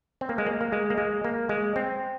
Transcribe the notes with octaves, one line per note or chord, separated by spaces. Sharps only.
C4
A#3
G#3
A#3
A#3
G#3
A#3
G#3
A#3
G#3
C4